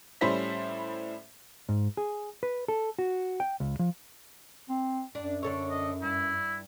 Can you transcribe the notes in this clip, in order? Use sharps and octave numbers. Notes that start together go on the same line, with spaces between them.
A2 G3 C#4 E4 C5 B6
G#2
G#4
B4
A4
F#4
G5
C#2
F3
C4
F#2 D4
D3 A4 C#5
D#5
G2 E4